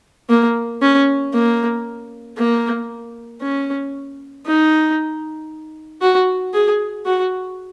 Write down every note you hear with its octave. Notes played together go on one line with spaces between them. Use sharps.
A#3
C#4
A#3
A#3
C#4
D#4
F#4
G#4
F#4